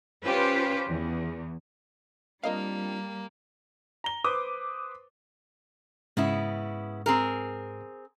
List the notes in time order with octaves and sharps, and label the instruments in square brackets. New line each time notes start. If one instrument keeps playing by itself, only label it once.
[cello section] C#4 F4 G4 B4 C5
E2
[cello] G3 [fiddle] A#3 [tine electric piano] C4 D4 F4 [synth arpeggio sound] A#4 D#5 F5
[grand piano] A#5 G7
B4 C5 D6 D#6
[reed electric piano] G#2 [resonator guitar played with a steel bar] C#3 B3 E4
[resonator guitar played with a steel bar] C4 G#4 A#4